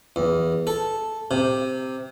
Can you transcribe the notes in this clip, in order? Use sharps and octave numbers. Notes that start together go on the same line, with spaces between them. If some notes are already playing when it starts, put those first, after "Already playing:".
E2
A4
C3